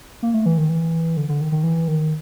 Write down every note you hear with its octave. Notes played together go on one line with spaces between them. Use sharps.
A#3
A3
E3
D#3
E3
D3
D3
D#3
D#3
E3
D#3